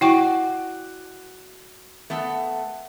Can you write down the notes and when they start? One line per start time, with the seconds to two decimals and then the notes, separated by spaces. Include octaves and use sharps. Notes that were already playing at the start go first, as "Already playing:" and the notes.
0.01 E4 F#4 D5 G5 C#6
2.10 A3 B3 A4